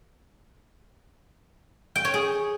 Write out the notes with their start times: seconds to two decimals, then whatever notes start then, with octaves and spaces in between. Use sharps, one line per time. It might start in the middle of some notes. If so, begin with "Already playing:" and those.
1.96 G5
2.05 C#5
2.14 G#4